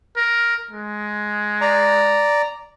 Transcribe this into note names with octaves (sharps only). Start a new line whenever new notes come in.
A#4
G#3
D5 A#5